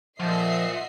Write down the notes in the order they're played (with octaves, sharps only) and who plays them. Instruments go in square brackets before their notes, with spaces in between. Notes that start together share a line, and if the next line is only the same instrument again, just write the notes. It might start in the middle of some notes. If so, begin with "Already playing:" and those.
[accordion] A#2 [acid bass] F3 [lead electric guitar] F4 F#5 [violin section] D#5 E5 C7